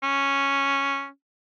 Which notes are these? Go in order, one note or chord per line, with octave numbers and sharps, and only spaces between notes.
C#4